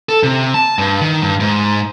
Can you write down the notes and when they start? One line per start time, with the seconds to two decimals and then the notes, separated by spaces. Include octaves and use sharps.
0.09 A4
0.23 C3
0.54 A5
0.79 G2
1.01 D#3
1.22 G2
1.40 G#2